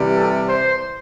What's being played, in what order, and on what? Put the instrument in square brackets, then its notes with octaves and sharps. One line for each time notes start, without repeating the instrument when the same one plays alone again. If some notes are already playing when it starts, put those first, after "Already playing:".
Already playing: [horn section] C3 E3 G3
A4
C5